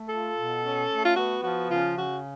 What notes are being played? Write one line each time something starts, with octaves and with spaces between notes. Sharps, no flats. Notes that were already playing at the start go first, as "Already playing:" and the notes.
Already playing: A3
F4 A4
B2
C#4
A3
F4
B3 F#4
F3 F#4
C#3 F4
C#3 F#4